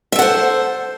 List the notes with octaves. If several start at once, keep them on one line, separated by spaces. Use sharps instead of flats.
A4 C5 E5 F#5